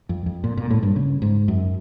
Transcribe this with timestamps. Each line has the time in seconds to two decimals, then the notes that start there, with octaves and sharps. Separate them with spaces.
0.09 F2
0.26 F2
0.44 A#2
0.57 A#2
0.70 A2
0.83 G2
0.96 C#3
1.22 G#2
1.48 F#2